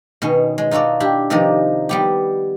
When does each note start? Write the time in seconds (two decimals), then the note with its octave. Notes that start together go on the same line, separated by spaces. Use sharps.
0.22 B2 D#3 C#4
0.58 G#3
0.71 D#4 F4 F#4 A4 D5
1.00 D4 E4 G4
1.30 C3 D#3 F3 D#4 A#4 D5
1.89 G3 B3 G4